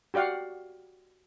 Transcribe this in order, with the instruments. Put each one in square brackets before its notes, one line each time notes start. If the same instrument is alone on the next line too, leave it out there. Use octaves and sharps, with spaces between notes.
[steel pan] F#4 G4 D5 F5 F#5